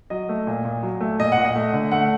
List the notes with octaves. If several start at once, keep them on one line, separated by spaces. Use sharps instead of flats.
F#3 D#5
A3
A#2
A#2
F#3
A3
A#2 D#5
F#5
A#2
D#5
A3
D3
A3 F#5